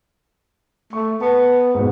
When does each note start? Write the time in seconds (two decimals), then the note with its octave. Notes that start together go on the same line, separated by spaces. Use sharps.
0.93 A3 C#6
1.21 B3 A5
1.75 G#2 B2